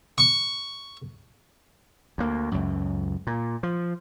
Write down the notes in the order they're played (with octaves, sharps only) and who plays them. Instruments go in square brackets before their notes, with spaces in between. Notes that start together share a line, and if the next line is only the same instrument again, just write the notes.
[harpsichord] C#6
[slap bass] D2 A#3
C#2 F#2
A#2
F3